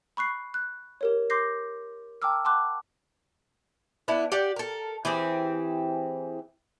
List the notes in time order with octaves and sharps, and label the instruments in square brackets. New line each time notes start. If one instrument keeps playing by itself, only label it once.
[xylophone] B5 C#6 F#6 C7
F#6
G4 A#4 C#5
C6 D6 G6 A#6 C7
G5 A5 A#5 D6 E6 F6
F#5 A5 C6 D6 F#6
[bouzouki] B3 D4 E4
G4 D5 F#5
A4 A#4
E3 C4 G4 G#4